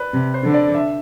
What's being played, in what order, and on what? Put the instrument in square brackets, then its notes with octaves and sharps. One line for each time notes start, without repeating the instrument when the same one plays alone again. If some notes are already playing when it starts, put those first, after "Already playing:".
Already playing: [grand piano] B4 D5
[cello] C3
[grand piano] C5
[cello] D3
[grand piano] D5
E5